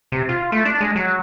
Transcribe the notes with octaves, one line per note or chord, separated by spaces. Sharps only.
C3
F4
A3
D4
G#3
F#3